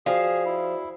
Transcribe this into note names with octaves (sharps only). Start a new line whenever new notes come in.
F3 F#4 G#4 D5 F5 G5
E4